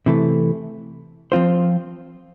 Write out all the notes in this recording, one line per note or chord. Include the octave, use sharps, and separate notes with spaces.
C3 E3 A3
F3 C4 F4 C5